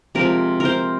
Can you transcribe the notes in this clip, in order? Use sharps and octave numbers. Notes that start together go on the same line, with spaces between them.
C3 F3 G#3 A#4
A#4 C5